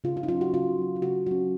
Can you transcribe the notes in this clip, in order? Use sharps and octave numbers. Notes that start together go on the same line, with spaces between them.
C#3 F4
F4
D#4
F#3 C#4 F4
F#4
C#3 F4
F#3 C#4
F4
C#3 F#4
F#3 C#4 F#4